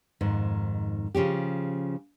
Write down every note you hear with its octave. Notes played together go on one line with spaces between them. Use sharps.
F2 G#2 D#3
C#3 F3 C#4 G4